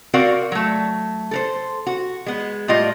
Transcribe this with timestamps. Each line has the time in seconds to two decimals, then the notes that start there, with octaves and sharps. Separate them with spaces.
0.13 C4 F#4 A#4 D5 F5 F#5
0.52 F#3 A3
1.31 A4 A#4 C5
1.87 F#4
2.26 G#3 B3
2.68 A2 G3 F4 D#5